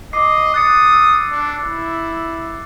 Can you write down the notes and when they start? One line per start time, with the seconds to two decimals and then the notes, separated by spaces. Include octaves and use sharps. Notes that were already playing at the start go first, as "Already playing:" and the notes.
0.13 D#5 D6 C7
0.54 D#6 F#6 A6 C#7
0.92 E6
1.31 D4
1.63 E4